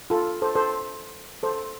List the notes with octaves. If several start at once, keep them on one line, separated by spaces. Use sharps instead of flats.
F4 A4
A4 C5
A4 C5
A4 C5